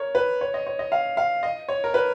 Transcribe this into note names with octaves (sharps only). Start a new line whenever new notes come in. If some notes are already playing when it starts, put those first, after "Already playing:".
Already playing: A#4 C#5
B4
C#5
D#5
C#5
D#5
F5
F5
D#5
C#5
A#4
B4